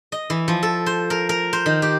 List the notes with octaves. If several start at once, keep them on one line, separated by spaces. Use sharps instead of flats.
D#5
E3
F3
A4
C5
A#4
A#4
C5
D#3
G4